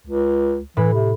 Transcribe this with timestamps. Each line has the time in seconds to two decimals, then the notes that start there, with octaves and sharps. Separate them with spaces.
0.07 C#2
0.77 A2 E3 B5
0.93 C3